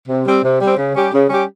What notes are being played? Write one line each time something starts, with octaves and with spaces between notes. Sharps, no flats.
C3
G3 C4
C3
G3 C4
C#3
G3 C#4 G4
C#3
G3 C#4 G4